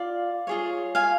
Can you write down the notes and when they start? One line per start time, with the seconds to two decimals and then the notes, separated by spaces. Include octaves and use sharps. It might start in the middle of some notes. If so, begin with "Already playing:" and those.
Already playing: F4 D5 F5
0.47 F4 G#4 C#5
0.95 F5 G#5